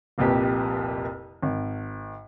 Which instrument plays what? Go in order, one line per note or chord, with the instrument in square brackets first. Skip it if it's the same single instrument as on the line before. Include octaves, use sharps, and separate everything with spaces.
[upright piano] F1 C2 F2 A#2 G4 B4
G#1